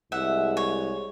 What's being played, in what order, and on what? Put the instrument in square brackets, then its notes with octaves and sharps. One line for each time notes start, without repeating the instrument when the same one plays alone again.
[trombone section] C2 G#3 [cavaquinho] E5 F#5
[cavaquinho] C#5